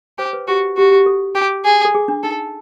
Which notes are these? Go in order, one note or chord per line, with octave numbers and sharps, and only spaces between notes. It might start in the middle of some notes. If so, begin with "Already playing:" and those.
G4 C5
B4
F#4 G4
F#4 G4
G4
A4
G4
G#4
A4
G#4
D4
D#4 A4